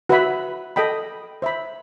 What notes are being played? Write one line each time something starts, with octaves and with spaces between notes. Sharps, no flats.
F#4 B4 E5 B5
A4 D#5 G5 B5
C5 E5 B5